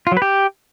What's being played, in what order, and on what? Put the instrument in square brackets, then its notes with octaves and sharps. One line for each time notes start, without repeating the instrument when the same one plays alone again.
[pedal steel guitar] F4
F#3
B4
G4